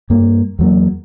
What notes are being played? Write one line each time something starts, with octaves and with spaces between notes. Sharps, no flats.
G2 A#3
E2 F#3 A#3